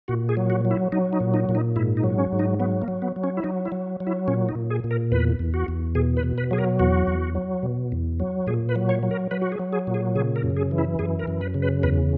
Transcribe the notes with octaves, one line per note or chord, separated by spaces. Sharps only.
A#2 F#4
G#4
F#3
F#4
F#3
E4
F#3 D#4
D#4
A#2
D#4
A#2
D#4
G#2 E4
D#4
F#3
C#4
G#2
D#4
F#3 B3
A#3
F#3
B3
F#3
C#4
E4
F#3 D#4
E4
F#3
F#3
E4
A#2 C#4
D#4
A#2
G#4
A#2
A#4
E2 B4
E2
F#4
E2
B2 G#4
B4
B2
B4
F#3 G#4
A#4
E2 F#4
E2
F#3
B2
E2
F#3
A#2 G#4
B4
F#3
C#5
F#3
A#4
F#3 B4
F#4
G#4
F#3
G#4
A#2
G#4
C#3 G#4
A#4
F#2
G#4
E3
E4
F#2 G#4
A#4
F#2
B4
C#3
B4
E2 B4